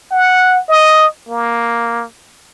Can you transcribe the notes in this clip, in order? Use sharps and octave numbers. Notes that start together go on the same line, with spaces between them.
F#5
D#5
A#3